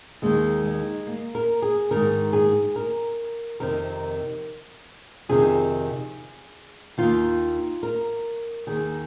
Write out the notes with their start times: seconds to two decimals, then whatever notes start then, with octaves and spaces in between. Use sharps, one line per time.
0.22 D#2 D#3 G#3
0.64 G#3
1.07 A#3
1.35 A#4
1.62 G#4
1.91 G#2 D#3 A#4
2.33 G#4
2.76 A#4
3.60 F2 C3 D#3 A#4
5.29 F2 C3 D#3 G#4
6.98 D#2 D#3 F4
7.83 A#4
8.67 D#2 D#3 G#4